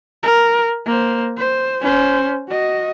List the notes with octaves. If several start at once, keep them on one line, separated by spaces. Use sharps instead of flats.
A#4
A#3 C5
C5
C#4 C5
F#4 D#5